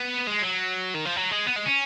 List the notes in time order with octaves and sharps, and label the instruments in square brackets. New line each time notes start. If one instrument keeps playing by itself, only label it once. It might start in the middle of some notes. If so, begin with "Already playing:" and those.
Already playing: [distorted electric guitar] B3
G#3
F#3
D#3
F3
F#3
G#3
B3
G#3
C#4